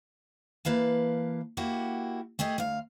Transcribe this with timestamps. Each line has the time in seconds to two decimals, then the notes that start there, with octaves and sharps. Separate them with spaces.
0.65 E3 A#3 B4 F5 A5
1.57 A#3 E4 F#4 G4
2.39 A3 G4 G#4 D#5
2.58 D2 F5